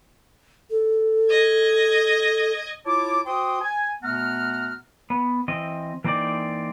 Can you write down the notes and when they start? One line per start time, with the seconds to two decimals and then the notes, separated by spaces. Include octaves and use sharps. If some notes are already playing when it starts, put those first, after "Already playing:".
0.70 A4
1.30 D#5 G#6
2.86 E4 F4 C#5 A5 D6
3.26 F#4 C5 G5 C6 D6 D#6
3.61 G#5
4.03 B2 A3 B3 F#5 A#5 F6
5.10 B3
5.48 E3 C4 D#5
6.04 E3 A#3 C4 D#4 D5